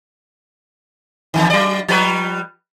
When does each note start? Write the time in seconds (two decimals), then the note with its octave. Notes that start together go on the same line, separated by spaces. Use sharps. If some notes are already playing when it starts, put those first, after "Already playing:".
1.34 E2 A2 D#3
1.50 F#3 D5
1.88 F3 G3 B4